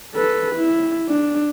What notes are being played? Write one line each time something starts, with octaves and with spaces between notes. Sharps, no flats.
A4 B4
E4
D4